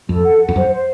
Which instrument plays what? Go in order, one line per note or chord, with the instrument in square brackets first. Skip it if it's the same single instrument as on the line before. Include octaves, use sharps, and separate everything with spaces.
[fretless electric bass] F2 [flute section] A4
[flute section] F#5
F#5
[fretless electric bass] F2
[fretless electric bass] F#2 [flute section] C5
[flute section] C5